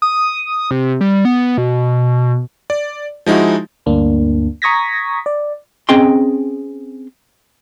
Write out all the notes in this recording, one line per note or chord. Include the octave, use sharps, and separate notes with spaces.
D#6
C3
G3
B3
B2
D5
F3 G#3 D#4 E4 F#4
D2 G2 A#3 D4
A#5 C#6 D#6 G#6 A#6 B6
D5
C4 C#4 G#4 D#5 G5 C6